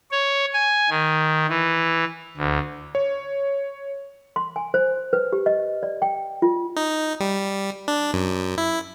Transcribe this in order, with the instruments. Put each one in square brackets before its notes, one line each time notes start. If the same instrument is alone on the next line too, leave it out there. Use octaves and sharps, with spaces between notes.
[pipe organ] C#5
G#5
D#3
E3
D2
[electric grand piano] C#5
[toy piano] C6
G#5
C5
B4
G4
D#5
D5
G5
F4
[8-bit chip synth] D#4
G3
D4
F#2
E4